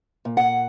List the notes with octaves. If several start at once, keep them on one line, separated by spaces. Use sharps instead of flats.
A#2
F#5